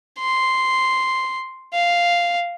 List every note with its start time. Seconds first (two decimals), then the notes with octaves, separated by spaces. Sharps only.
0.19 C6
1.73 F5